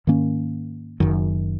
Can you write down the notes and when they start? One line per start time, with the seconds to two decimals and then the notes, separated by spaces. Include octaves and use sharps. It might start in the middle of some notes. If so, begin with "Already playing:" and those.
0.07 G#2 D#3 A#3 C#4
1.00 F#1 F#2 D#3